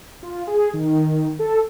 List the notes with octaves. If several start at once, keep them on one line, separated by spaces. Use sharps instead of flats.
F4
G#4
D#3
A4